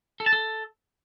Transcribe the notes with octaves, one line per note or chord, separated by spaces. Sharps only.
A4
A5
A4